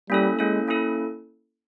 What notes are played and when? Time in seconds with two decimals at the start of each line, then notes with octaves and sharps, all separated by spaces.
0.10 G3 A#3 C#4 E4 A4
0.39 G#3 A#3 C#4 E4 A4
0.68 A#3 C#4 E4 A4